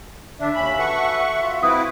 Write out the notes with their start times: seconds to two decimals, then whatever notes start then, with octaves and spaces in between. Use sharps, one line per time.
0.40 D3 D4 E5
0.55 D#2 C#4 B5
0.79 F#4 A4 B4 F#5 C#6
1.42 F4 F#4
1.63 C4 E4 B4 D#6